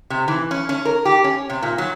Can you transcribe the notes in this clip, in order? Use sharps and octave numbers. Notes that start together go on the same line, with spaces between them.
C3
E3
C#4
C#4
A#4
G4
C#4
C3
A#2
F#3